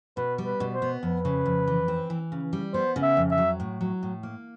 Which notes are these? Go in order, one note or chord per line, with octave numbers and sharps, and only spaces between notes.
B2 B4
G3
B4
B2
C5
B3
F2 B4
C#3
F2
E3
C4
E3
C#3
G3
B3 C5
C#3
E5
F2
E5
F#3
A2
F#3
A2
A#3